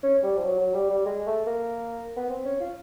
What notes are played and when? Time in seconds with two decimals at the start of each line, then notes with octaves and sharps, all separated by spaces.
0.03 C#4
0.23 G3
0.37 F3
0.44 F#3
0.59 F#3
0.74 G3
0.90 G3
1.06 G#3
1.27 A3
1.46 A#3
2.17 B3
2.29 C4
2.45 C#4
2.60 F4